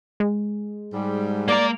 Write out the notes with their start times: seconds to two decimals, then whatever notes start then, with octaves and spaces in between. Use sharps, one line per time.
0.20 G#3
0.94 G#2 G3
1.48 A#3 A#4 D5